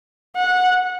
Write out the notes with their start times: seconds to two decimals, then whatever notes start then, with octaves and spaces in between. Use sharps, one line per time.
0.36 F#5